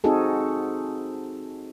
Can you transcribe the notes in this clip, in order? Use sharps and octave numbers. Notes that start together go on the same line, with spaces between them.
C4 D#4 F#4 G#4 A4